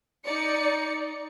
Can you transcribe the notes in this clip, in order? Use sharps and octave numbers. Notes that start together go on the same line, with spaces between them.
D#4 D5 C#7